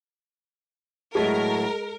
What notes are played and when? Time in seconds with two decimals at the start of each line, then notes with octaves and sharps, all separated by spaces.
1.15 A2 F#3 G#3 A3 A#4